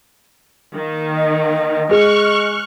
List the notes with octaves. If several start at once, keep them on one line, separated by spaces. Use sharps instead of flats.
D#3 A#3
D#5
G#3 C#6 F6 F#6